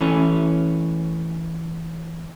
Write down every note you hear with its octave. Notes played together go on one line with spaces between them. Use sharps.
E3 A3 C#4